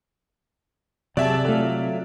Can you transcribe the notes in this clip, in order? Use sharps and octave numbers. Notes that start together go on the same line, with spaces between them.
C3 F#3 G#4 D5 E5 A5
F#3 A3 F4 A4